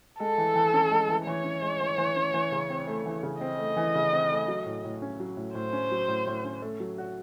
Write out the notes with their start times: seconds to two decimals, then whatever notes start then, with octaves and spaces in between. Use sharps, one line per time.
0.19 G#3 A4
0.38 E3
0.55 E3
0.74 C#4
0.92 G#3
1.09 E3
1.27 E3 C#5
1.44 C#4
1.62 G#3
1.81 E3
1.98 E3
2.16 C#4
2.34 E3
2.52 C#3
2.70 C4
2.87 A3
3.06 E3
3.23 C#3
3.41 C4 D#5
3.59 A3
3.77 E3
3.95 C#3
4.13 C4
4.30 A3
4.48 F#3
4.66 A2
4.85 A2
5.02 C#4
5.20 F#3
5.37 A2
5.55 A2 C5
5.73 C#4
5.91 F#3
6.08 A2
6.27 A2
6.45 C#4
6.62 A3
6.80 F#3
6.98 F#4